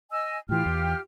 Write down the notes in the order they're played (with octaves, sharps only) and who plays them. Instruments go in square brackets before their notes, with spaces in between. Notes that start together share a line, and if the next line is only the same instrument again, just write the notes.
[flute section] D#5 G#5 E6
[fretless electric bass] A2 E3 [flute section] F4 G4 F6
[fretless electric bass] E2